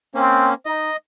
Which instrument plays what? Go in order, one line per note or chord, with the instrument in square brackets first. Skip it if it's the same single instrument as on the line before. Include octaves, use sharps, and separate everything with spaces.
[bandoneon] A#3 C#4 [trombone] C4
[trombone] D#4 [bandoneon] D#5